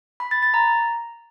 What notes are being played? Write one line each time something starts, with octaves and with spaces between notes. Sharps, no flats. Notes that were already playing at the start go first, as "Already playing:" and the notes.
B5
A6
A6
A#5